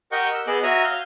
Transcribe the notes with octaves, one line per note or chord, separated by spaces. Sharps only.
G4 A#4 D#5 F#5 G5 C#6
E6
B3 G#4 D#5 D6 F#6
F#4 C#5 E5 A#5 D#6 F6
F5 F6 G6